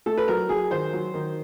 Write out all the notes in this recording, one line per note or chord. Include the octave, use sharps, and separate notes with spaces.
A3 A4
B4
F#3 A#4
F#3 G#4
D#3 C5
F#3
D#3